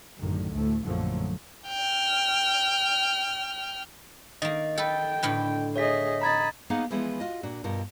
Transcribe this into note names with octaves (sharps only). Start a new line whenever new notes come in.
A1 F#2 A2 D3 D#3
D2 A2 A3
A#1 F#2 D3 F3 F#3 A3
G5 F6
D#3 A#3 D#5
A4 B4 G5
A2 D3 B4
G#4 C#5 D#5 E5 B6
D#5 A#5 B5 G#6 A6
A#3 B3 D#4 G#4 F5 F#5
E3 F3 G#3 B3
F4 F#4 D#5
A#2 D4 F#4
G2 B2 F4 A#4